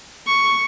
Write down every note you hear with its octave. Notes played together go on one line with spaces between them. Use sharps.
C#6